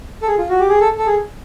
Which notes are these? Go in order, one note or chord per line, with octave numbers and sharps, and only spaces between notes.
A4
G#4
F4
F#4
G4
G#4
A4
A4
G#4